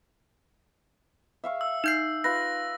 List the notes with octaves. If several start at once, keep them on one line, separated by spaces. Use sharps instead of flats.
E5 F5 C#6
E6
D#4 G6 C7
F4 B4 A#6